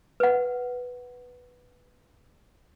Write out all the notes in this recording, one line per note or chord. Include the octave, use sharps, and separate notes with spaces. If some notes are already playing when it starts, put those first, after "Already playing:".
B4 F#5